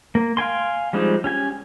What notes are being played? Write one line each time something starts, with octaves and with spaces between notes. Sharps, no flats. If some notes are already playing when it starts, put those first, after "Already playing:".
A#3
F5 G5 G#5 C6
F3 G3 G#3 C4 D#4
C#4 G4 G#5